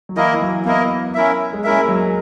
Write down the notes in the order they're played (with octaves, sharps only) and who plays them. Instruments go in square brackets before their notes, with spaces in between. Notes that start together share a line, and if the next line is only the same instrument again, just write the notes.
[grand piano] F#3
[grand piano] E3 [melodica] A#3 E4 A#4 D#5
[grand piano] E3
F#3
[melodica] A#3 E4 A#4 D#5 [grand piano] B3
[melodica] C#4 E4 A#4 E5
[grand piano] G#3
[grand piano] A#3 [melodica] C#4 E4 A#4 E5
[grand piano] G#3
F#3